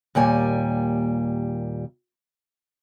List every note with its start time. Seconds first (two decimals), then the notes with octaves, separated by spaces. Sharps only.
0.15 D#2 A#2 G3 G#5